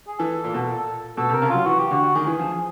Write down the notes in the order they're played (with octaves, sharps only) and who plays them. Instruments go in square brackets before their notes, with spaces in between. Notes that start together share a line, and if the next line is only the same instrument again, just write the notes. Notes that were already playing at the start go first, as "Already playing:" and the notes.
[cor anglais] G#4
[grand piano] E3 [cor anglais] A4
[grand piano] A#2
B2
A#2
[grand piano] B2 [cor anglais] A4
[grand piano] C3
[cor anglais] A#4
[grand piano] C#3
[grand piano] F#3 [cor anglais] F4
[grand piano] E3 [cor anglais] F#4
[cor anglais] G4
[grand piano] D3 [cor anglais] F#4
[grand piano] D#3 [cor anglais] G#4
[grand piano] E3
F3
F3